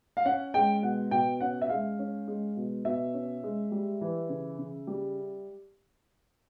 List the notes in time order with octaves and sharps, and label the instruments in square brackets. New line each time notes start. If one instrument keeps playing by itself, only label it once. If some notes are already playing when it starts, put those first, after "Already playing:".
[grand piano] F5
C#4 F#5
G#3 G5
B2 F#5
B2 G5
C#4 F#5
E5
G#3 F5
C#4
G#3
B2
B2 E5
C#4
G#3
G3
E3
C#3
C#3
G3